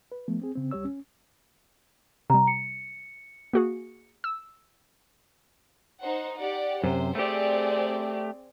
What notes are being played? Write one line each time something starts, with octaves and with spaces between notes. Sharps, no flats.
B4
F3 A3 B3
C4 G#4
C#3 C4
C#2 G3 G4 C#5 E6
C#4
C3 G3 A#5
C#7
A#3 F#4 G#4
E6
D#4 C5 F#5
G4 D5 F#5
F#2 C3 C5
A3 C4 G4 G#4 D5